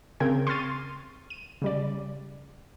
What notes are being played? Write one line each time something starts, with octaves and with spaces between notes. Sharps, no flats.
C#3 C4 A#4 G5 G#6
C6 C#6 F6 A6 D#7
D#7
C#3 G3 D5